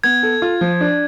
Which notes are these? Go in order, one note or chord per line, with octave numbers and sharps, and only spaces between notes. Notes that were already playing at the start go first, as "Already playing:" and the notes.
B3 G#6
A4
F4
F3
D4